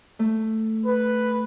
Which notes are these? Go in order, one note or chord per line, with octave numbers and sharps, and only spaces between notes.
A3
B4